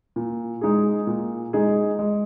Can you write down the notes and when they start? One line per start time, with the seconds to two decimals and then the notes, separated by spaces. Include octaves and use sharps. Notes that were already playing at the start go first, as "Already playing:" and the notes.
0.16 A#2
0.61 G#3 D#4 G#4
1.07 A#2
1.53 G#3 D#4 G#4
1.99 G#3